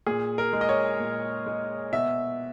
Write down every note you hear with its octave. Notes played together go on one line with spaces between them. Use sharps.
A#2 G#4
A#4
G#3
D#5
C#5
A#2
G#3
B2 E5